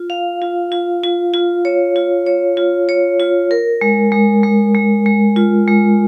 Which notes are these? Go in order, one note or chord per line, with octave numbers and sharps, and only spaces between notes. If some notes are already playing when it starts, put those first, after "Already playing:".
Already playing: F4
F5
F4
F4
F4
F4
C#5
F4
C#5
F4
C#5
F4
A#4
G#3
G#3
G#3
G#3
G#3
F4
G#3